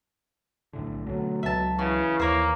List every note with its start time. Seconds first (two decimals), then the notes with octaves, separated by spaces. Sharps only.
0.73 B1 A2 D3
1.06 B2 D3 F#3 A3
1.43 C#2 B2 F#3 E5 A5
1.79 C#3 E3 F#4
2.20 D#2 A#3 C5 C#5